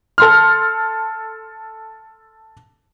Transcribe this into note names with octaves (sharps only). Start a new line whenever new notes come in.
A4 C6 F6